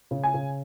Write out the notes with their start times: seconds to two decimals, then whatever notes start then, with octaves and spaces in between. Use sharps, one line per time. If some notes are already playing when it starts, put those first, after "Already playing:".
0.11 C#3
0.24 G#5
0.34 C#3